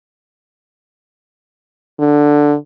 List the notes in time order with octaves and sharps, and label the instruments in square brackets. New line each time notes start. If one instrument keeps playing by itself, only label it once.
[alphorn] D3